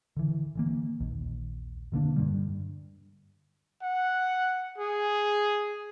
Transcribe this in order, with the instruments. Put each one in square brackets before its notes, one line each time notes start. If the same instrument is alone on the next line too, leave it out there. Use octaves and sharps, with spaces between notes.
[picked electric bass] D3 E3
D3 E3 A#3
A#1 D#2
B2 D3 A#3 D4
G2 D3 G3
[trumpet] F#5
G#4